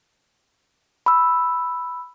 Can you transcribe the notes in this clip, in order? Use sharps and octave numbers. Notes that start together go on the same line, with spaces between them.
B5 E6